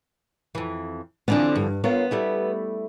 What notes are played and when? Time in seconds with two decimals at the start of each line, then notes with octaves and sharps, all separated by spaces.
0.55 F2 E3
1.28 D3 E3 F3 B3 C4 D4
1.55 G2
1.84 B3 F4 A#4 C#5
2.11 G3 A3 E4